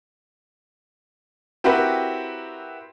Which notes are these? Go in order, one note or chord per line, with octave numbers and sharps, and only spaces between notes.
C4 E4 F#4 G4 A#4 B4